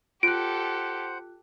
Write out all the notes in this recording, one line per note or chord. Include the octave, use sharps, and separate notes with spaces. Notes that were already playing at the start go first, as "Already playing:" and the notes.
F4 G4 A4 C5 F#5 F#6 D7